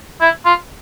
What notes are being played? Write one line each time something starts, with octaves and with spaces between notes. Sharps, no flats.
E4
F4